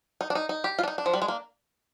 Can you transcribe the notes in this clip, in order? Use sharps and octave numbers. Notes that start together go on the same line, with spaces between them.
D#4
D4
D#4
D#4
G4
F4
D4
D#4
D4
F3
G3
G#3
A#3